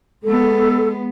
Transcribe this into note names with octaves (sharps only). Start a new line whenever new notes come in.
G#3 B3 A4